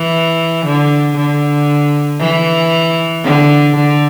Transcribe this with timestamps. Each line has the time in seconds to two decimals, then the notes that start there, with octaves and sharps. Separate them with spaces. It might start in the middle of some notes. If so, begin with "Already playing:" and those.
Already playing: E3
0.65 D3
1.16 D3
2.20 E3
3.24 D3
3.76 D3